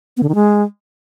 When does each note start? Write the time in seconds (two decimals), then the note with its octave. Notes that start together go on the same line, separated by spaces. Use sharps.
0.17 B3
0.23 D3
0.29 D#3
0.35 G#3